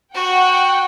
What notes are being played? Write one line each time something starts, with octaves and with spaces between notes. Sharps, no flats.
F#4 F#5 G5